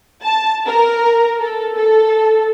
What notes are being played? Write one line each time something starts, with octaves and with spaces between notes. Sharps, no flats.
A5
A#4
A4
A4